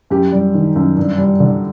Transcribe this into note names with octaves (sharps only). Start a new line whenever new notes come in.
F#2 G4
G3
D#3
F#2
G2
G3
D3